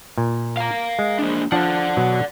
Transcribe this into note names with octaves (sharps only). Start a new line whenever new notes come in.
A#2
F5 A#5
G#3
A#3 D4
F3 D4 D5 F#5
B2 F#3